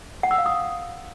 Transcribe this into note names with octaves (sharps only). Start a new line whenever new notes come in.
F#5
E6
F5
D#6